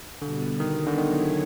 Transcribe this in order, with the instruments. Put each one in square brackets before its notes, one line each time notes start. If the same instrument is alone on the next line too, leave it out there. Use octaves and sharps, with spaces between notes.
[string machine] B2 G3 B3 [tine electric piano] D3
[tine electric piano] D#3
D3
[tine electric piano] D#3 [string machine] F#3 B3 E4 G#4 C#5